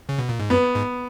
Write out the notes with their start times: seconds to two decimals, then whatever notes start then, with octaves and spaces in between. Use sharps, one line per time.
0.09 C#3
0.18 B2
0.29 A#2
0.40 G#2
0.50 F#2 B3
0.75 G#2